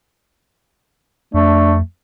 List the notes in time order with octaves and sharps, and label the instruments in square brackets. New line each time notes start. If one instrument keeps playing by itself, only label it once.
[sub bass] F2 [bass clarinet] A3 [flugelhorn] D4